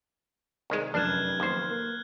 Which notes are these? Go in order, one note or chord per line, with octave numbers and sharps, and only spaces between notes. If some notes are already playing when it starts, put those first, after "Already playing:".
C2 D#3 G#3
F1 F#2 D4 F6 F#6 G#6 E7
D#2 C5
A#3